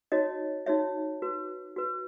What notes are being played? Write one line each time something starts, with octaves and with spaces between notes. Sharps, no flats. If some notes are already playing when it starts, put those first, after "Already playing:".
D#4 F#4 C#5 D#5
D#4 F#4 C#5 E5
F#4 B4
F#4 B4